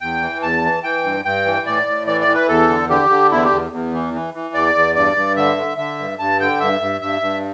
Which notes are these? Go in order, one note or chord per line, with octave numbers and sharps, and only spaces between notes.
E2 G5
E3
E2 A5
E3
E3 G5
G2
G2 G5
E3
A2 D5
A2
E3 D5
D5
E3
B4
E2 A4
D3
D3 G4
D3
E2 E4
G4
E2
E2
E3
E3
E3
E2 D5
E2
G2 D5
G2
D3 E5
D3
D3 E5
G2
G2 A5
D3 G5
G2 E5
G2
G2 E5
G2